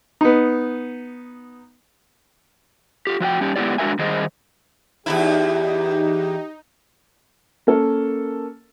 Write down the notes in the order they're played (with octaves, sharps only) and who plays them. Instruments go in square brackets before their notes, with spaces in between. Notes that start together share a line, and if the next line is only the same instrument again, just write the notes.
[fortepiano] B3 D#4
[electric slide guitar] F4 G4
F3 F#4 F#5 G5
G3 C#4 G4
G#3 B3 C4 E4 G4 D5
G#3 D4 F#4 A#4 E5 G#5
D#3 G3 G#4 C5 D#5
[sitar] E2 G2 E4 [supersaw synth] D#4 [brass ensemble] G4
[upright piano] A#3 C#4 A4 A#4